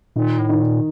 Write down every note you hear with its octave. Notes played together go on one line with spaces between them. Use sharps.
A#2 D#3
A2
D#3
A#2